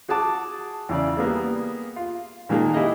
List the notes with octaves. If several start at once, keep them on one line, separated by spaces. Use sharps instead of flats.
F#4 G#4 F#5 A5 D6
E2 C#3 D5
G3 A#3 B3 G#4
F4
A#2 D#3 G#3 A#3 G#4 A5
E4 G4 G#4 D#5 F5